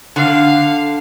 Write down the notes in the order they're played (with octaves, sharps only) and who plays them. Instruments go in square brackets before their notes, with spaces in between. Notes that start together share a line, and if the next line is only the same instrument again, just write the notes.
[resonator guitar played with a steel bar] D3 [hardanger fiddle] F5